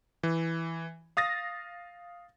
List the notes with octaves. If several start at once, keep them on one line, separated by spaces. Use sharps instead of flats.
E3
F5 D#6 A6 A#6